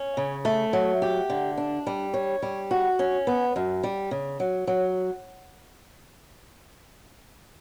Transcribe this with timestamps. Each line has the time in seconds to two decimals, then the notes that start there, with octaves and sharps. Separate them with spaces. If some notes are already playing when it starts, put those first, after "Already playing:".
Already playing: C#4
0.17 C#3
0.45 A3
0.73 F#3
1.02 G4
1.30 D3
1.58 D4
1.87 G3
2.14 C#5
2.42 G3
2.71 F#4
2.99 C#4
3.27 B3
3.56 F#2
3.83 G3
4.11 C#3
4.40 F#3
4.67 F#3